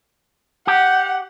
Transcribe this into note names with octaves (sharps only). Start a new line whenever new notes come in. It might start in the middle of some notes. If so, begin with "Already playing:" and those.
G4 F#5